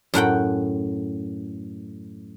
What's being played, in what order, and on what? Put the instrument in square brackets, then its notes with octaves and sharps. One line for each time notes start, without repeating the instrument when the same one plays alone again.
[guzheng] F#2 A2 F#5 G5